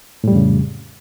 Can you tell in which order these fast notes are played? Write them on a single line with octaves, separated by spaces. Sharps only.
A2 G3 F2 C#3